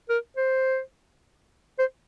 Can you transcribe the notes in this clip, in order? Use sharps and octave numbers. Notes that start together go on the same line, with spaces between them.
A#4
C5
C5